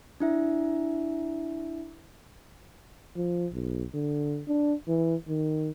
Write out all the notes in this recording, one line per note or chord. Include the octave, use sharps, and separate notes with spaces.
D4 E4 E5
F3
B1
D3
D4
E3
D#3